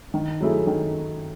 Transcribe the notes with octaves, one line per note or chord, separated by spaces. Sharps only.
D#3
F#3 A3 E4 G#4
D#3